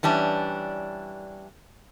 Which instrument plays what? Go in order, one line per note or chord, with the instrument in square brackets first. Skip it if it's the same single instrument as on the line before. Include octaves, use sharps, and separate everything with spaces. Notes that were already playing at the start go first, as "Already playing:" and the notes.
[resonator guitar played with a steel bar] E3 G3 C#4 D4